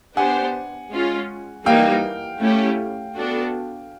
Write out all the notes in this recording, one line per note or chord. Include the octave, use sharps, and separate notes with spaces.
B3 D4 G4 C5 F#5 G#5
G#3 C#4 F4
E3 G3 A#3 D#4 F5 G5
A3 C#4 E4 G4
B3 D4 F#4 A4